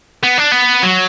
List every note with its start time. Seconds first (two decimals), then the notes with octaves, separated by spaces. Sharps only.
0.23 B3
0.38 D4
0.52 B3
0.83 F#3